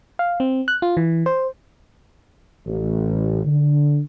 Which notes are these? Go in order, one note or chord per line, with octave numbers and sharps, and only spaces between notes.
F5
C4
F#6
F4
E3
C5
A1
D3